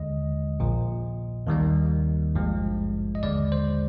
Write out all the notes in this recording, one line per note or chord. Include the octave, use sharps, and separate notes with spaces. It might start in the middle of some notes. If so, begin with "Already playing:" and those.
Already playing: D#2 D3 G#3 D#5
A#1 A#2 F3
D#2 D#3 G3 A#3
G#1 G2 F3 G#3
D#5
D#2 D3 G#3 D5
C5